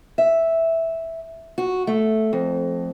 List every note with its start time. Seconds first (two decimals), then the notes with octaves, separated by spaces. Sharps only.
0.18 E5
1.58 F#4
1.87 A3
2.33 F2